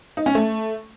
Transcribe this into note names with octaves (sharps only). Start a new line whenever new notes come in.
D#4
C#4
A3